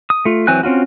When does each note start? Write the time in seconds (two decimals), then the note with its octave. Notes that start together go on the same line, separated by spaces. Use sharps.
0.10 D#6
0.25 A3 F4
0.47 E3 F#3 C4 G#5 F#6
0.63 C4 C#4 F4 F#4